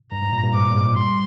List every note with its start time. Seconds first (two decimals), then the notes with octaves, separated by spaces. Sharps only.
0.12 G2 A#5
0.22 G#2
0.32 A#2
0.43 G2
0.54 G#2 D6
0.70 A#2
0.75 G#2
0.95 G3 C6